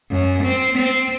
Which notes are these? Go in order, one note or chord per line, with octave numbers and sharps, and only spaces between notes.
F#2
C4
C4